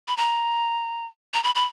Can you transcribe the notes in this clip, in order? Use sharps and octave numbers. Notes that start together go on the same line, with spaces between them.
B5
A#5
A#5
B5
B5